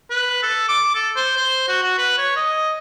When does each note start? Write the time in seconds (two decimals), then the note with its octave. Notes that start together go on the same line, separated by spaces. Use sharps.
0.10 B4
0.43 A4
0.69 D6
0.94 A4
1.16 C5
1.37 C5
1.68 F#4
1.83 F#4
1.98 B4
2.18 C#5
2.36 D#5